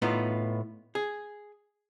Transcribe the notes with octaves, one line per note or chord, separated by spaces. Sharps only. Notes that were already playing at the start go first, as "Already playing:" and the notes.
A2 B3 D#4 F4
G#4